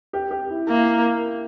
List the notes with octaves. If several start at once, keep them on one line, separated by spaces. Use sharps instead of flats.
G4
G4
E4
A#3 E4